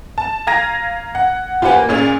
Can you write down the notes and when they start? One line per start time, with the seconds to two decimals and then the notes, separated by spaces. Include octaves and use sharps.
0.18 A5
0.47 F5 A#5 G#6 A#6 D#7
1.15 F#5
1.62 F4 G4 B4 C5 F#5 G#5
1.76 A#3
1.89 A#2 C#4 G#4